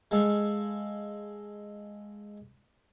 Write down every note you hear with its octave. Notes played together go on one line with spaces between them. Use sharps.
G#3 A4 F5